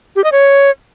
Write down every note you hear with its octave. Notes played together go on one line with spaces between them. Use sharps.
G4
D#5
C#5